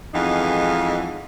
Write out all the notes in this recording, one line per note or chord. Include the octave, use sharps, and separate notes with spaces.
F2 E3 G#3 B3 D#4 F5